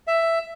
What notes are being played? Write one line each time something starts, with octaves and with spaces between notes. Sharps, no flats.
E5